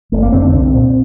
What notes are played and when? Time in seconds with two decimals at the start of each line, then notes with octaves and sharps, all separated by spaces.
0.12 G1 A3
0.23 A#3
0.32 F2 D3 C4
0.42 D4
0.52 C2 C4
0.73 A#2